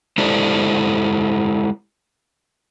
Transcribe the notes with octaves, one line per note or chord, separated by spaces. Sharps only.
G#3 E4 G4 A4 C5 D5